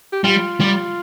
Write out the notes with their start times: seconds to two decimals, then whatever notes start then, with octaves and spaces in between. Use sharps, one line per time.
0.13 G4
0.24 G3 F4
0.60 G3